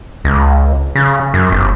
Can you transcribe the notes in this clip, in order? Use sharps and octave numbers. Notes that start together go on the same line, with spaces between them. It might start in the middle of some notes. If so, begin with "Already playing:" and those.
C#2
C#3
F#2
G1